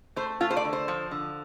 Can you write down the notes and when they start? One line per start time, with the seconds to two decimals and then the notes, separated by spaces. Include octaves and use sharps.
0.16 A3 C5
0.40 A3 F4
0.51 C5
0.57 D5
0.65 D3
0.73 C5
0.88 F3
1.11 D3